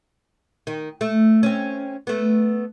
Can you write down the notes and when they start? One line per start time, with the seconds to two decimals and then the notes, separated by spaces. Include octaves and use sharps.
0.67 D#3
1.01 A3
1.43 C4 C#4
2.07 A3 B3